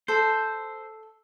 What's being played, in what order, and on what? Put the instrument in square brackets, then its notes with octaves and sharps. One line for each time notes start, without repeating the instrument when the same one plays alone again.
[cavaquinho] A4 [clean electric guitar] C5